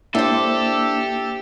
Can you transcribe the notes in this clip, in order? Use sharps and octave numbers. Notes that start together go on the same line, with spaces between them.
A#3 D4 E4 G4 A4 C5 E5